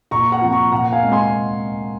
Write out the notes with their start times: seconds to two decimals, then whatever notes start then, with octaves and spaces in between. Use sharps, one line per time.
0.11 A#2 A#5 C#6
0.32 F#5 A#5
0.42 F3 C4
0.52 A#5 C#6
0.72 A#2 F#5 A#5
0.92 F5 G#5
1.03 G#3 C4
1.12 G#5 C6